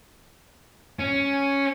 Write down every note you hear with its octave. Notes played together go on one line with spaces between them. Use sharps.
C#4